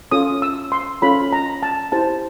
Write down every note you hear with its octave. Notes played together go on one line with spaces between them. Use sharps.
C#4 F4 A4 C#5 D#6
E6
C6
C#4 F4 A4 C#5 B5
A#5
A5
E4 G4 C5 A5